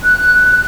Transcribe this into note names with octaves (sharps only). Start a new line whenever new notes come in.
F#6